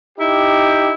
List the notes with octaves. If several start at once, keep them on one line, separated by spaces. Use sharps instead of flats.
D#4 E4 G4